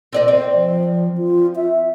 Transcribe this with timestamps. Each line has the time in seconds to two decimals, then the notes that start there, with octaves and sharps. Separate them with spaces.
0.13 C4 D5 D#5
0.28 C4
0.55 F3
1.18 F4
1.56 E5